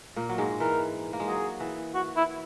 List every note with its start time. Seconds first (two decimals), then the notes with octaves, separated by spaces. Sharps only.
0.16 A#2 A#3
0.29 F#3
0.38 G#2 G#3
0.60 E3 A#4
1.13 A#3
1.20 G#3
1.27 F#3 G#4
1.60 E3
1.94 F#4
2.17 E4